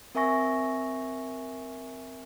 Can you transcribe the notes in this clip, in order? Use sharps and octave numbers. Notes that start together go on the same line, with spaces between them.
C4 A#4 E5 G#5 C#6 A#6